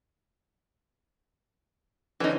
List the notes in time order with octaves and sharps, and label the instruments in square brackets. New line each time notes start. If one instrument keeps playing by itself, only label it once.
[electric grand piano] D3 C#4 [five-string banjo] E3 D#4